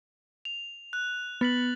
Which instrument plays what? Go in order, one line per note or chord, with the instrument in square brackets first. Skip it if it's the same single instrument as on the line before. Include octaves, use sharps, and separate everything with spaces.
[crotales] F7
F#6
[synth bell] B3 [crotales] A6 B6 F#7